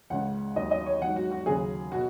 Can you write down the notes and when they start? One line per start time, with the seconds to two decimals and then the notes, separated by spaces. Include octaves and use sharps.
0.10 C#2 C#3 G#3 F#5
0.56 D#2 D#3 F#3 D#5
0.71 D#5
0.86 C#5
1.01 G#2 F#3 F#5
1.16 F#4
1.31 F#4
1.46 D#2 C#3 F#3 G#4
1.92 B2 F#4